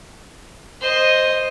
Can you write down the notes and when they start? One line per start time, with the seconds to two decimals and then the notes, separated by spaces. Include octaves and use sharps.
0.81 C5 D#5